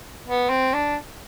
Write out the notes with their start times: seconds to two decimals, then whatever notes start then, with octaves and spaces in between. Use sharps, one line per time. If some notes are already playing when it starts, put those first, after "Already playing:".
0.26 B3
0.49 C4
0.74 D4